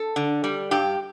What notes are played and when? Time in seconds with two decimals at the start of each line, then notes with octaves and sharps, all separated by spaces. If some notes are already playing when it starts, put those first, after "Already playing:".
Already playing: A4
0.16 D3
0.44 G3
0.71 G2 G4